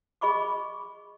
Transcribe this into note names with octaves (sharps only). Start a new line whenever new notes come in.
G#4 D#5 B5 C#6 D6